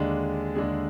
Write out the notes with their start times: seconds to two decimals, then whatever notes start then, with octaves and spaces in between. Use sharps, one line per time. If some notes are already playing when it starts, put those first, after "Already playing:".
Already playing: D#2 D3 G#3 D4 G#4
0.55 D#2 D3 G#3 D4 G#4